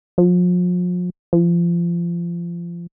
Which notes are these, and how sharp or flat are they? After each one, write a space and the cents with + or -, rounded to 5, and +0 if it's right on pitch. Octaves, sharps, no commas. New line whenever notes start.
F3 +40
F3 -25